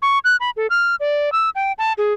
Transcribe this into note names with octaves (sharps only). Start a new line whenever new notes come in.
C#6
F#6
B5
A4
F6
D5
E6
G5
A5
G#4